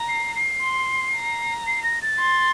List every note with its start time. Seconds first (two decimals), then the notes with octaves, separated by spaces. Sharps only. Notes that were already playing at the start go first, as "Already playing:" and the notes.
Already playing: A#5
0.08 C7
0.36 C7
0.61 C6
1.15 A#5
1.67 C7
1.84 A#6
2.02 A6
2.19 C6